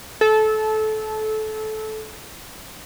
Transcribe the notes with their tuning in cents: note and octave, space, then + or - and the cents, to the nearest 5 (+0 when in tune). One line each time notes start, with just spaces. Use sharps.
A4 -20